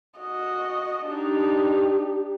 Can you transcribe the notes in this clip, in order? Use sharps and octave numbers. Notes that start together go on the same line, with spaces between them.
F#4 D#5
D4 D#4 G4